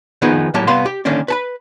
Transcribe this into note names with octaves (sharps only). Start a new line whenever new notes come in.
D#3 F3 B3 D#4 G#4 B4
A2 F#3 A#3 G4 A5
C2 B3 F5 B5 C6
G4
D3 D#3 A#3 C#4 D4
B4 A5 B5